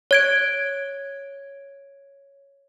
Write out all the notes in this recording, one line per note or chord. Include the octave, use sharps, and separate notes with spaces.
C#5 G#6 D7